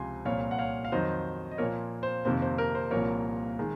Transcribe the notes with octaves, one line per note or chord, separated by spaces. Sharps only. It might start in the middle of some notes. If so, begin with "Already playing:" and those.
Already playing: C#2 C3 F3 G#5 C6
C2 A#2 F3 C#5 F5
F#5
C#5 F5
F5
F2 D#3 F#3 C5 D#5
D#5
A#2 F3 A#3 A#4 C#5
C5
F2 C3 D#3 A#3 C5
C5
A#4
C5
C2 A#2 F3 A#3 A#4 C#5
D#3 G#3